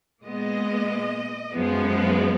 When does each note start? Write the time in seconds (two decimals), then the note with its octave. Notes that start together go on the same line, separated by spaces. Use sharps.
0.24 A#2 G#3 B3 D#5
1.54 F#2 F3 G#3 B3